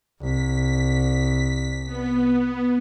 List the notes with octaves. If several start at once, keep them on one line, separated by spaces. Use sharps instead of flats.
C2 B6
B3